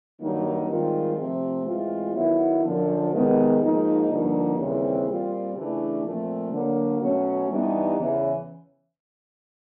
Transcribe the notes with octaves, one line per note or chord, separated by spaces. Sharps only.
G2 D#3 F#3 A#3 D#4
G#2 D#3 G3 C4 F4
C3 F3 A3 C4
A2 E3 G#3 C4 F4
D#3 F#3 B3 E4
F#2 D3 F3
C3 D#3 G#3 B3 D#4
G#2 F3 A#3 D#4
G2 D3 F3 A#3 D#4
D#2 C#3 E3 G3 C4
A#2 G3 C4 F4
C#3 E3 A3 D4
A#2 F3 A3 C4
D3 F#3 A#3
B2 F#3 A3 C#4
G2 E3 G3 B3 D#4
E2 C#3 E3